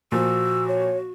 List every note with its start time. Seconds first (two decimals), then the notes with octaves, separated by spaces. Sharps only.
0.12 A#2 F3 F#4 E6
0.68 C#5